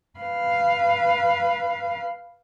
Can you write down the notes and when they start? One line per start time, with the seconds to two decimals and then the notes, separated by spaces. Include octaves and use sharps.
0.19 B4 F5